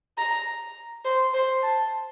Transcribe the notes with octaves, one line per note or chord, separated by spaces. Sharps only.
A#5
C5
C5
A5